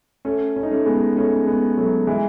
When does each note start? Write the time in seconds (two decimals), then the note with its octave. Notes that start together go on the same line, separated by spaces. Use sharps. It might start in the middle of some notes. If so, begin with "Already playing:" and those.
0.25 A3 C#4
0.56 C#4
0.63 D#4
0.71 A3 C#4
0.85 G#3 B3
1.16 A3 C#4
1.46 G#3 B3
1.77 F#3 A3
2.07 E3 G#3